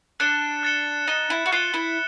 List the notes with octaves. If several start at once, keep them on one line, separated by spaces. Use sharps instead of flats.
D4 F#6 A6 C#7 E7 G7
F#6 A6 C#7 E7 G7
D#4 F#6 A6 C#7 E7 G7
E4
F#4
F4 F#6 A6 C#7 E7 G7
E4